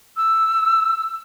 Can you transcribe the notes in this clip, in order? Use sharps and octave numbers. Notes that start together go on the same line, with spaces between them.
E6